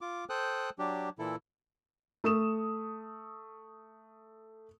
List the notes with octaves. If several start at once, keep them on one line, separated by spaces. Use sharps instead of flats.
F4 D6
A4 C5 G5 D#6 F#6
F#3 D4 G4
A#2 E3 E4 A4
A3 D#6 E7